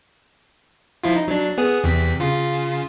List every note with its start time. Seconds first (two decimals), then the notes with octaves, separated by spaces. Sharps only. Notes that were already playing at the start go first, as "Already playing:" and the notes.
1.04 F3 E4 F4
1.15 D#4
1.28 F#3 D4
1.58 B3 G#4
1.84 E2 C3 B6
2.20 C#3 F4